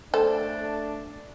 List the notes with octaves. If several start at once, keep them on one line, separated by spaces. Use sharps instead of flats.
A3 D4 A4 C5